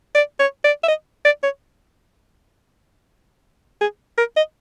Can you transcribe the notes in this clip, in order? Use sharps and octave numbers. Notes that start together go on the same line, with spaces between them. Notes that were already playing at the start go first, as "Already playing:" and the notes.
D5
C#5
D5
E5
D#5
D5
C#5
G#4
A#4
D#5